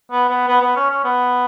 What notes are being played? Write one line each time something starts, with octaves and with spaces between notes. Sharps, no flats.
B3
B3
B3
B3
C#4
C#4
B3